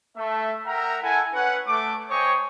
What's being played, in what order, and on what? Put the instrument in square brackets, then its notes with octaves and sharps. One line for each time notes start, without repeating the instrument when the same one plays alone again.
[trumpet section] A3 E5
A#4 E5 F#5 G5 A#5
E4 A4 F#5 G#5
C#4 B4 F#5
A3 D6
C5 C#5 D#5 G5 G#5 C#6